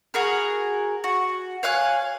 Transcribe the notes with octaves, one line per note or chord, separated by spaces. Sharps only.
F#4 G#4 A#4
F#4
C#5 F5 G#5 F#6